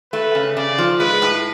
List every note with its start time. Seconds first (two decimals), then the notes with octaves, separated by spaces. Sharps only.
0.13 A3 B4
0.35 C#3
0.57 C#3 D5
0.78 F3
1.00 G#3 B4
1.22 A2